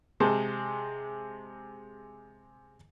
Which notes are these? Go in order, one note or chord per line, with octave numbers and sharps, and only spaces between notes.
C3 G#3 C5 A5